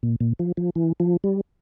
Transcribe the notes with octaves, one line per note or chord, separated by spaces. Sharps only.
A#2
A#2
F3
F3
E3
F3
G3